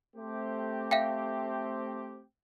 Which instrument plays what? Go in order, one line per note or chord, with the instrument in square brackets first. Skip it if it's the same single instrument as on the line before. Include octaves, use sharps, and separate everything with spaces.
[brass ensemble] A3 C4 G4
[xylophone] E5 F5 G5